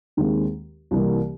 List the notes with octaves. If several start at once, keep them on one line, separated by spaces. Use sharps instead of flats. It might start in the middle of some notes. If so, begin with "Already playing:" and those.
D#2 D#3 G#3 C4
C2 C3 E3 G3 A#3